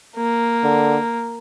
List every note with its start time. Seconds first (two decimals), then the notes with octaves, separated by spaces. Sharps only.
0.16 A#3
0.63 D3